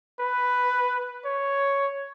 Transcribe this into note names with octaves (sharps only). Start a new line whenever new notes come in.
B4
C#5